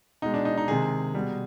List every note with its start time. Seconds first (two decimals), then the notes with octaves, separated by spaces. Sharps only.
0.22 B2 G#3 D#4
0.34 D4
0.45 D#4
0.57 D#4
0.68 C3 D#3 G#3 G#4
1.14 B2 G3